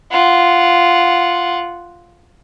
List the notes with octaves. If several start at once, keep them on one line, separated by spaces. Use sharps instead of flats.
F4 F#5